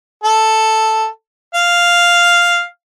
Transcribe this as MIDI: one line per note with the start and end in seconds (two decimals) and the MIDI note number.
0.24 1.07 69
1.54 2.64 77